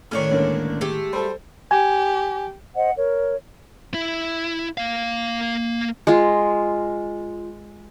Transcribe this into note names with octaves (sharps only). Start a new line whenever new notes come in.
A2 D#3 C#4 D4 C#5
C#2 D3 A#3
G#3 A3 G4
G3 A4 C5
G4 G#5
C5 D#5 F#5
A#4 C#5
E4
A#3 F5
G#3 F4